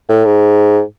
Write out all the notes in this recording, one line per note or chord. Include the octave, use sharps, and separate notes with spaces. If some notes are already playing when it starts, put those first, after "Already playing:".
A2
G#2